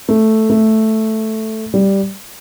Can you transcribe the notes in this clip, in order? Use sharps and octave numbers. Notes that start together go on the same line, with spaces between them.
A3
A3
G3